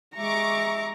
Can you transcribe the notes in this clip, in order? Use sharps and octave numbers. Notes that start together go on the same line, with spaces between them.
G#3 E5 A#5 C#6 D6